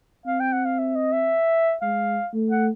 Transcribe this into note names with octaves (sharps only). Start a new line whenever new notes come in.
C4 F5
G5
F#5
F5
E5
D#5
E5
G#3 F5
A3
F#5